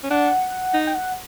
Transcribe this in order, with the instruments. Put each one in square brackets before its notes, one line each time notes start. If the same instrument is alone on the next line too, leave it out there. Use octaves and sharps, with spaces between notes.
[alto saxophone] C#4
[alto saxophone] D4 [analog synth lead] F#5
[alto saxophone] D#4
[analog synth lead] G5
F#5